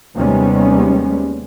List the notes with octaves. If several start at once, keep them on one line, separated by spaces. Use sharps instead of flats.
D#2 C3 G3 G#3 B3 C#4